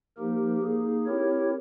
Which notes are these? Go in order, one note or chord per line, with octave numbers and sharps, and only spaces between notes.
F3 A#3 D#4 G4 A#4
A#3 D#4 G#4
C4 E4 G4 A#4 C#5